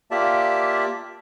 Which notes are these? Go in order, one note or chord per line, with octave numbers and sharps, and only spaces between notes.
A#3 F4 G4 D5 E5 A5